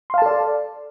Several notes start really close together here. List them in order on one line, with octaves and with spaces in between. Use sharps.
C6 F5 A5 A4 D5